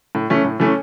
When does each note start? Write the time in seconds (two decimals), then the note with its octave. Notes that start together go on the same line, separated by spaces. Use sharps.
0.15 A2
0.30 E3 A3 C#4
0.45 A2
0.60 E3 A3 C#4